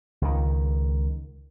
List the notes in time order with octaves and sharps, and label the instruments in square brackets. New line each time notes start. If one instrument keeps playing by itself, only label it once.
[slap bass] C#2 D#3